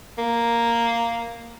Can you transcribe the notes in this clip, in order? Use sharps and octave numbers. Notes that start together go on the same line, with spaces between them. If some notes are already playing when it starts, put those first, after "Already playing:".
A#3